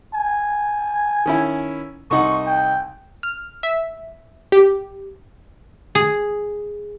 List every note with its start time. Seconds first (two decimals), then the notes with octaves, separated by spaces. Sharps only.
0.14 G#5
1.26 D#3 C#4 E4
2.11 C2 D#4 F#5 C#6
2.46 G5
3.23 F6
3.63 E5
4.52 G4
5.95 G#4